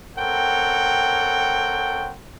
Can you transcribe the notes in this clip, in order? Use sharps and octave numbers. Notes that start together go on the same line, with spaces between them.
C4 A4 A#4 C#5 F#5 G5